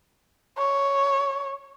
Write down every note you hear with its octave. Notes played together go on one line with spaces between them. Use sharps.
C#5